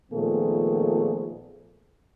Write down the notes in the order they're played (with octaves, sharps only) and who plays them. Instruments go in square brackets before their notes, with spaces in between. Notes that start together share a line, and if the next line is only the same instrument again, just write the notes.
[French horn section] A#2 D#3 F3 A3 B3 G#4